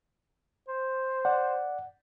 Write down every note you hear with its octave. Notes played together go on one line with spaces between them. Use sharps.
C5
D5 F#5